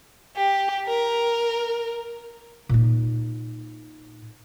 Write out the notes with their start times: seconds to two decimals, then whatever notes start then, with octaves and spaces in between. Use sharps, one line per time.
0.36 G4
0.87 A#4
2.69 A#2 D#4